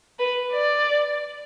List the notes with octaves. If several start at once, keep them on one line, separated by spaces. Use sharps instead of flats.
B4
D5